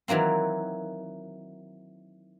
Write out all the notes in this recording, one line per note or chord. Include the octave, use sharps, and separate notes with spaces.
D#3 E3 F#3 A#3 C4